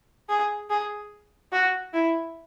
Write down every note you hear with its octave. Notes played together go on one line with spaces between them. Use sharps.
G#4
G#4
F#4
E4